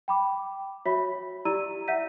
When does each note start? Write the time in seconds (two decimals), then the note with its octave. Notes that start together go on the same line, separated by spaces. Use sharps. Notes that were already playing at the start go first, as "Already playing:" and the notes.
0.08 G5 B5 D6
0.86 F#4 C#5 E5 B5 B6
1.45 E4 G4 D5 A#5 E6 D#7
1.88 E5 F#5 G6 B6 D#7